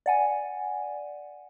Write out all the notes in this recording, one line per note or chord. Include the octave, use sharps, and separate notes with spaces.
D5 F#5 G#5